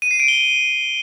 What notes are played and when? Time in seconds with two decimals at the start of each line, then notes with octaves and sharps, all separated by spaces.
0.02 D#7
0.11 C7
0.20 D7
0.28 G7